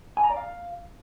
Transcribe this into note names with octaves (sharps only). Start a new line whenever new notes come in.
G#5
A#5
D5
F5